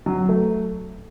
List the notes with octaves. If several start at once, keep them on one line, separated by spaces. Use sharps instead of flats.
F#3
A3